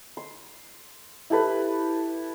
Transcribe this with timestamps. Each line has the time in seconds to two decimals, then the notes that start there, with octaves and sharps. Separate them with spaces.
0.17 C6
1.30 E4 G4 A4 B4